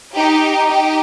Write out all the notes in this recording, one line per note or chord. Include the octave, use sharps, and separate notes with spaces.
D#4 G4
D#4 G4